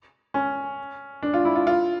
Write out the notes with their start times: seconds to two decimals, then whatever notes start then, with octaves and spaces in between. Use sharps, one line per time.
0.34 C#4
1.23 D4
1.34 F4
1.45 E4
1.56 F4
1.67 F4